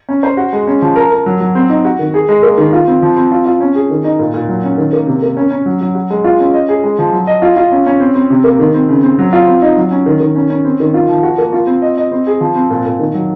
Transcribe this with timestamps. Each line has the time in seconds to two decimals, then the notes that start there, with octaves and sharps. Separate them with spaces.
0.09 C#4
0.23 C5
0.37 F#4
0.53 G#3
0.67 C#4
0.82 F3
0.96 A#4
1.11 A#4
1.26 F#3
1.40 F#3
1.55 C4
1.69 D#4
1.85 F#4
1.99 D#3
2.14 G#4
2.29 G#3
2.43 A#3
2.58 D#3
2.73 F4
2.87 C4
3.02 F3
3.16 C4
3.31 F4
3.46 F4
3.60 C#4
3.75 G#4
3.90 D#3
4.04 D#4
4.19 A#2
4.34 A#2
4.48 F#3
4.64 C#4
4.78 D#3
4.93 A#3
5.07 C3
5.22 A#3
5.37 C#4
5.51 C#4
5.66 F#3
5.81 F#3
5.95 F#4
6.10 G#3
6.24 F4
6.40 C#4
6.54 D#5
6.69 G#4
6.84 G#3
6.99 F3
7.12 F#3
7.27 D#5
7.42 F4
7.56 F4
7.72 C#4
7.86 C#4
8.00 C4
8.15 C4
8.30 C3
8.44 A#3
8.59 D#3
8.74 C4
8.89 C#3
9.03 C4
9.19 F#3
9.33 F4
9.47 C4
9.62 D#4
9.77 F#3
9.91 C#4
10.06 D#3
10.20 D#3
10.36 C#4
10.50 C#4
10.65 C4
10.80 D#3
10.94 F4
11.08 F3
11.23 F#4
11.38 A#3
11.53 F4
11.67 C4
11.82 D#5
11.97 D#5
12.12 C4
12.27 G#4
12.41 F3
12.55 C4
12.70 A#2
12.85 A#2
12.99 D#3
13.14 F#3